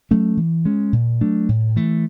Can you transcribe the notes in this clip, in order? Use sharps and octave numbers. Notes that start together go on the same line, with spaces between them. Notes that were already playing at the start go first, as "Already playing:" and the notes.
F#3 A3 C#4
E3
G#3 C#4
A#2
F#3 A3 D4
A2
E3 A3